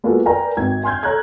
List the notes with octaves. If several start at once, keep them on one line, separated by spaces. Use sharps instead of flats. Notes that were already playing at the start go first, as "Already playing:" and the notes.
G#3 A#3 B3 F4 F#4 A4
A#4 B4 D5 G5 G#5 A#5
G#1 G5 G#6
G#5 C6 F6 G6 G#6
A4 C#5 A#5 F6 F#6 G#6